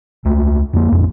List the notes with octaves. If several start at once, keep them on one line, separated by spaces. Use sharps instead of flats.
C#2 A3
F2 A#3
A1 F2